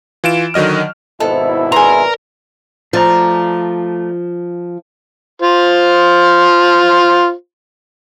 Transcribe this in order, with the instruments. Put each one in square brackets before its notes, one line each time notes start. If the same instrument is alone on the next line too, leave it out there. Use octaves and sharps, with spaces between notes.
[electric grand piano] E3 F4 D7 E7
D3 D#3 F#3 D#5 F6
[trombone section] G#1 B2 E4 [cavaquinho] A4 [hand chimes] C5 D#5
[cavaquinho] G#4 C6 [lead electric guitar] A#4 A#5 [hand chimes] B4 D5
[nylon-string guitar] F3 [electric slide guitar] A3 D5 A#5
[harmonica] F4 C5